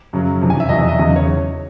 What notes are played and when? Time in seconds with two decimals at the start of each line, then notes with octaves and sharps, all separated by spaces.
0.13 F#2 C#3 F#3
0.41 F2 C3 E3
0.50 G#5
0.60 E5
0.69 E2 B2 F#3 D#5
0.79 E5
0.88 D#5
0.97 E2 C#3 F#3
1.16 C#5